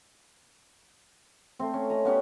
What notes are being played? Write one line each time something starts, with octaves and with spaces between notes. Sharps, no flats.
A3 C4
C#4
D#5 A#5
B3 C#4 G4